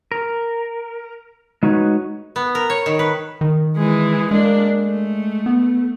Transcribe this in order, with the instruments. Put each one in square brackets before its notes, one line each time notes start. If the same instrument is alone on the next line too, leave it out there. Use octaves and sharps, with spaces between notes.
[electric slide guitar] A#4
G#3 D#4 F#4 B4 C#5
[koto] B3
A#4
C#5
D#3
B4
[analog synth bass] D#3
[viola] E3 G#3
[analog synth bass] G#3 [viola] A#3 D4
[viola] A3
[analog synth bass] B3